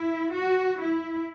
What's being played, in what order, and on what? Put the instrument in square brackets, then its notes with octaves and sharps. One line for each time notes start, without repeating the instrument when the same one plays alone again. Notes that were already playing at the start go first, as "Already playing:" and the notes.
Already playing: [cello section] E4
F#4
E4